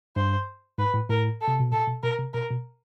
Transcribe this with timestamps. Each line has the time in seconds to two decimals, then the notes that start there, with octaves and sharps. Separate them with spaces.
0.16 G2 C5
0.78 G#2 B4
0.94 A2
1.09 A2 A#4
1.41 A4
1.48 C3
1.60 B2
1.72 A#2 A4
1.87 B2
2.03 B2 A#4
2.19 C3
2.34 B2 A#4
2.50 B2